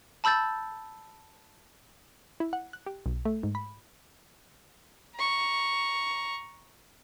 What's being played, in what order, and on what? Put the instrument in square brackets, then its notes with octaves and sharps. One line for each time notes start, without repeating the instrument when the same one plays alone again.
[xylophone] A5 B5 E6 G6 A6
[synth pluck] E4
F#5
F#6
G4
B1
A3
G#2
B5
[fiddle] A#5 C#6